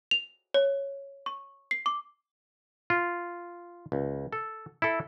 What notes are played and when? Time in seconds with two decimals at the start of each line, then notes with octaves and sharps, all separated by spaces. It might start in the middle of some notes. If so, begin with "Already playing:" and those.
0.11 F7
0.54 C#5
1.26 C#6
1.71 C7
1.86 D6
2.90 F4
3.92 C#2
4.33 A4
4.82 E4 A4